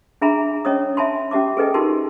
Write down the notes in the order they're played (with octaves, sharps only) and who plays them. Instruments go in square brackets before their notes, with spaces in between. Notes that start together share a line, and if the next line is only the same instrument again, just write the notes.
[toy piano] D4 G#4 E5 G#5 A#5 B5
C#4 C#5 D#5 D#6
E5 G#5 A5 B5 C6
C#4 G4 E5 A5 D6
G#4 A4 B4 D#5 G5 G#5
D#4 F4 G4 A#4 A5 C6